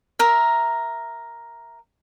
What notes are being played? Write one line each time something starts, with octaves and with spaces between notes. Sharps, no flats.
A#4 E5